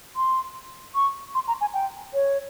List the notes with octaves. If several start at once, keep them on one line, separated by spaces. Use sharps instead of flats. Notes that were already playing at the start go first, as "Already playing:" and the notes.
C6
C#6
C6
A#5
G#5
G5
C#5